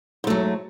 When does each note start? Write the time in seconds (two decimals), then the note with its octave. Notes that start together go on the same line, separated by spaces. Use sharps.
0.24 G#2
0.27 A3
0.30 F#3